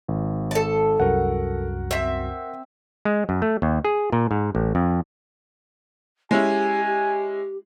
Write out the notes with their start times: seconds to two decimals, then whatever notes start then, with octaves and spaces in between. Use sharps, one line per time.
0.08 G#1
0.51 A4 A5
1.00 C2 F#2 F#4 A#4 F#5
1.91 C4 E5
3.05 G#3
3.29 F#2
3.42 A3
3.62 D#2
3.85 G#4
4.12 A#2
4.31 G#2
4.55 A1
4.75 F2
6.31 G#3 C#4 E4 G4 G#5
6.86 G4